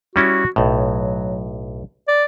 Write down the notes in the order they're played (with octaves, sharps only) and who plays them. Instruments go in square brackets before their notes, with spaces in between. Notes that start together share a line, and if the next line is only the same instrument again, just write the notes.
[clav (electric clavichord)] G3 C#4 E4 [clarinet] F#4
[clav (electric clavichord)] B1 A2 [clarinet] F#3
[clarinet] D5